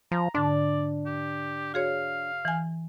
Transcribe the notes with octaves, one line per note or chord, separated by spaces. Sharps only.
F3 A#5
G#2 D3 D4 D5
G4
F#4 G#4 C#5 F5
E3 G#5